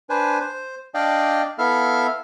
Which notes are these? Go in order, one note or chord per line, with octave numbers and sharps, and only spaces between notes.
D4 B4 C5 G#5
C5
D4 D5 D#5 F5 G5
B3 E4 A4 E5 F5 F6